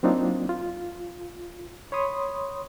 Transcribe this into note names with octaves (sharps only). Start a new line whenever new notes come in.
F#3 A#3 C4 D4 D#4 F4
F4
C#5 B5 C6 D#6